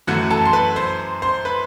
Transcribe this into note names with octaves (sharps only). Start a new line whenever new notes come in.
F#2 E3 A3 F#4 F#5
A4 A5
C6
B4 B5
C5 C6
C5 C6
B4 B5